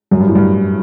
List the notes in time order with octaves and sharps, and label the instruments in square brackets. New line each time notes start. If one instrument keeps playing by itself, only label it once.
[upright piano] F#2
G2
A2
G2